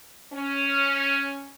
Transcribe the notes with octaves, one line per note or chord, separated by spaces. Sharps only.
C#4